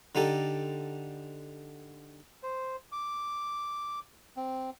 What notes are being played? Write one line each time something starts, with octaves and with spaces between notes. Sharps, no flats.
D3 D#4 G4 A4
C5
D6
C4